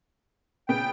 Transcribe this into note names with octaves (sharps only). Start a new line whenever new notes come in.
A#2 C#3 B3 G5